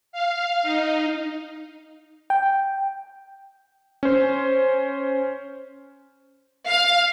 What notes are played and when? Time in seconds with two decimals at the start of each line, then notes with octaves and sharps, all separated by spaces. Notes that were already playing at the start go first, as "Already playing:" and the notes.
0.12 F5
0.62 D#4
2.30 G5
4.03 C#4 C5
6.68 F5